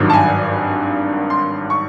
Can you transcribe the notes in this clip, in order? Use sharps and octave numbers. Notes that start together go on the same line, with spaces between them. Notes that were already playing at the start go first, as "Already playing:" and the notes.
Already playing: G#1 G2 D#3 F#3
A5
G#5
C6
C#6